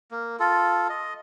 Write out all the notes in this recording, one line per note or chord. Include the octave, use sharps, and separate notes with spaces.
A#3
F4 A4
D#5